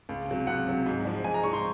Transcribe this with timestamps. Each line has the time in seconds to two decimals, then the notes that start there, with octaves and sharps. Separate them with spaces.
0.09 C#2
0.28 C3 F#3
0.47 C#2 F#5
0.67 C3 F#3
0.86 G#2
1.05 F3 G#3
1.24 G#2 G#5
1.34 A#5
1.43 F3 G#3 C#6
1.53 C6